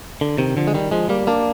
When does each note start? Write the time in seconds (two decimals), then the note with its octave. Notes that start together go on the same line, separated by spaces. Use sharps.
0.21 D3
0.38 C3 D#3
0.57 D3 F3
0.67 G#3
0.74 D#3 G3
0.91 F3 G#3
1.09 G3 A#3
1.27 A#3 D4